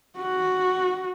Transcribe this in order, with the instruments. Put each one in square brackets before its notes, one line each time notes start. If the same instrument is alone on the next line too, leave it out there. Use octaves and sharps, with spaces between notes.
[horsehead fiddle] F#4